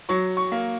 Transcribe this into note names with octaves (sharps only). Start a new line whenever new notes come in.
F#3 C#6
C#6
A#3